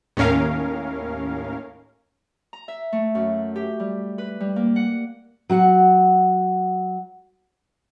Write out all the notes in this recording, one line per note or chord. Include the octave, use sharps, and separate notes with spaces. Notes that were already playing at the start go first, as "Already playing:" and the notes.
D#2 A2 C#4 A#4 F5
A#5
E5
A3
F#2
G4
G3
B4
G3
A#3
F#5
F#3 F#4 F#5